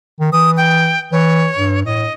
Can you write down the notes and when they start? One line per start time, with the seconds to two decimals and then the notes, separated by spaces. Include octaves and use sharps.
0.20 D#3
0.32 E3 D#6
0.57 G5
1.12 E3 C#5
1.57 G2
1.85 A2 D#5